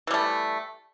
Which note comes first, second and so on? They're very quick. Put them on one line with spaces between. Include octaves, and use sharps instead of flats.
E3 G3 A3